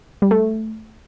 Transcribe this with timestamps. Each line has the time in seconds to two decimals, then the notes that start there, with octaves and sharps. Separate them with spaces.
0.22 G3
0.31 A3